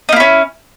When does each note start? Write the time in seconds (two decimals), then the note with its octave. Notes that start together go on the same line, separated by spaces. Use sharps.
0.09 D#4
0.12 A#3
0.16 E4
0.20 C#4